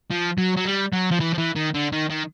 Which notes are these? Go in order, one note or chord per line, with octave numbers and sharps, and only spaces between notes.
F3
F#3
F#3
G3
F#3
F3
E3
F3
E3
D#3
D3
D#3
D#3